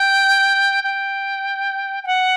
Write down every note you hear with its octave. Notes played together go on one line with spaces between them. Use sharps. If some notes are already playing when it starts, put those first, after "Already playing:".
Already playing: G5
G5
G5
F#5